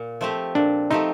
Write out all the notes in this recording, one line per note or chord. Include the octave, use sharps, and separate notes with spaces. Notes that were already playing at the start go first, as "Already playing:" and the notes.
Already playing: A#2
F3 A3 C4 G4
A#2 D4
F3 A3 C4 D#4 G4